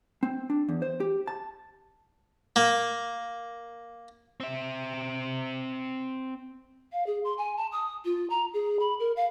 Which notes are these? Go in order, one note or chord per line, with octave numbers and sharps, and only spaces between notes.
C4
D4
E2
C5
G4
A5
A#3
C4 E5
F5
G#4
C6
G#5
A5
D#6
F4
A#5
G#4
B5
A#4
F5